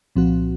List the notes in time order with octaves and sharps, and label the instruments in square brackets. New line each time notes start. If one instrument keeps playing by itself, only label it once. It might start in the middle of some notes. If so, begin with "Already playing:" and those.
[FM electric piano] C2 A#2 F3 C4 F#4